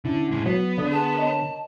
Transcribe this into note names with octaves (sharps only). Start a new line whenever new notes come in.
D3 C#4 E4
A2 G#3
F#3 B3 C7 C#7
D3 D5 D#6
G#4 F#5 A5 C6
A#4 C#5 D#5